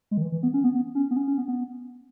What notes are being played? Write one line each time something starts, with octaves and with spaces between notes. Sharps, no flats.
G#3
D#3
E3
E3
B3
C#4
B3
B3
C#4
B3
C#4
C#4
B3
B3